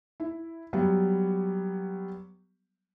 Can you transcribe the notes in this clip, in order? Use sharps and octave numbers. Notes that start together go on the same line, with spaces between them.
E4
F#3 G3 B3